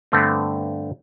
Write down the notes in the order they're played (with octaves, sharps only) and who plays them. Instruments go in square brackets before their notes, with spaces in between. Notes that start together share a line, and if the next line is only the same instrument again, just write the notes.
[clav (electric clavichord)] G2 D3 A3 B3 C4